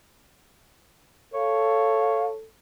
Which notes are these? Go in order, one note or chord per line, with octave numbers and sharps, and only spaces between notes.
A4 C#5 F5